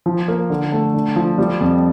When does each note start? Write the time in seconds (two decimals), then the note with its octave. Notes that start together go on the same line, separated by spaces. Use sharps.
0.06 F3
0.28 A#3
0.50 D3
0.72 A3
0.94 D3
1.16 F3
1.38 G3
1.61 F2